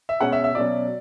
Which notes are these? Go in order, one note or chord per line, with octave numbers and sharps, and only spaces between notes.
E5
B2 G#3 C#4 F#5
E5
E5
B2 F#3 C#4 D5